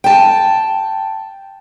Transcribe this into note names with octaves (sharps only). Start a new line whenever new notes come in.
G5 A5